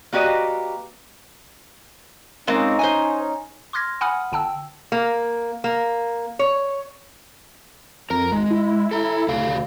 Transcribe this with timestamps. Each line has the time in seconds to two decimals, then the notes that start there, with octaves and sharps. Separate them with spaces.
0.13 A#3 F#4 G4 B4 D5 D#5
2.47 G#3 A#3 C4 C#4 D#4
2.79 C5 D#5 G#5
3.73 C6 D6 F6 G#6 A#6
4.01 F#5 G#5 B5 D#6 F6
4.32 G1 G5 A5 E6
4.92 A#3
5.64 A#3
6.39 C#5
8.10 F2 A#4 A#5
8.32 G#1 G#3
8.51 E4
8.91 A4 A#5
9.29 D2 C#3 A4 F5